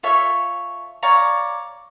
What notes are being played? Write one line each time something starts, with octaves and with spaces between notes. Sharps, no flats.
F4 A4 C#5 E5
C#5 D5 F5 A#5